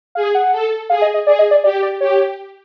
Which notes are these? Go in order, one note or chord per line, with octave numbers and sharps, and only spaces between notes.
G#4 F5
F#5
A4
G#4 F5
D#5
D#5
G#4 D5
D#5
D5
G4 D5
D5
G4 C#5